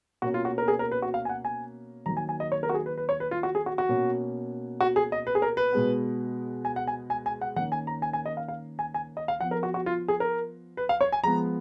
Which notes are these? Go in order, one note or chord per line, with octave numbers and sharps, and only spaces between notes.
B2 A#3 C#4 F#4
F4
F#4
A#4
G#4
A#4
B4
F#4
F5
G#5
F#5
G#5
D#3 F#3 A#3 A#5
G#5
G#5
D#5
C#5
A#4
F#4
G#4
B4
B4
C#5
B4
F4
F#4
G#4
F#4
F#4
B2 A#3 C#4
F#4
G#4
D#5
B4
G#4
A#4
B4
B2 G#3 B3
G#5
F#5
G#5
G#5
G#5
F#5
D#3 A#3 C#4 F#5
G#5
A#5
G#5
G#5
D#5
F5
F5
G#5
G#5
D#5
F5
F3 B3 F#5
A#4
F#4
F#4
F4
G#4
A#4
B4
F5
C#5
G#5
F3 G#3 B3 A#5